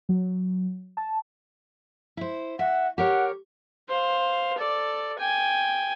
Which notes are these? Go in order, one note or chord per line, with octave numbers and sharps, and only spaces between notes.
F#3
A5
E4 C5
E5 F#5
G4 A#4 C#5 F#5
C5 F5
A4 D5
G5 G#5